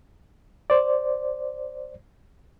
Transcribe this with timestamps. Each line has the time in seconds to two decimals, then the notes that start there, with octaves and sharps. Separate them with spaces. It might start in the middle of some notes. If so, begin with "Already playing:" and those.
0.70 C5 D5